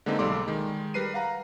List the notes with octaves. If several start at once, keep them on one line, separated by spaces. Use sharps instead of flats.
D3 G#3 A#3 C4 D#4
B1 G3 A4 D5 C6 D6
D#3 G#3
G3 A#4 B4 C7 D#7
F5 F#5 A#5